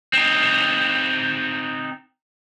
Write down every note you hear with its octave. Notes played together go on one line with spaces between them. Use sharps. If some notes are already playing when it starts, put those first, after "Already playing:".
C4 D#4